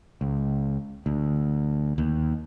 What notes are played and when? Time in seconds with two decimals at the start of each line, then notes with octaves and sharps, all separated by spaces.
0.21 C#2
1.06 D2
1.98 D#2